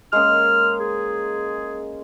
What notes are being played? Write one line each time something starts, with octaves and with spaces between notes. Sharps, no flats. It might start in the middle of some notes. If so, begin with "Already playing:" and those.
G#3 A#3 C#4 F6
G#4